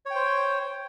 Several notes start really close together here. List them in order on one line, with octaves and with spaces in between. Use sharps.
C#5 G5 C5